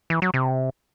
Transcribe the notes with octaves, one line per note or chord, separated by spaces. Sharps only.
E3
F#3
C3